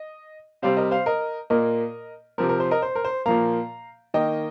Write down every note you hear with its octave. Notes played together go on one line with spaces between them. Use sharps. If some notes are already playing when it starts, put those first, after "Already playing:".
Already playing: D#5
C3 G3 C4 C5 F5
A#4 D#5
C5 F5
A#4 D#5
A#2 A#3 A#4 D#5
C3 F3 C4 A#4
A#4
C5
A#4 D#5
C5
A#4
C5
A#2 F3 A#3 F5 A#5
D#3 A#3 D#5 G5